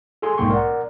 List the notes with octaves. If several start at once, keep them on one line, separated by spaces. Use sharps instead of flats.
G#4 A4 G#5 C6
B1 G#2 A#3 G5 C6 C#6
A#4 D5 F#5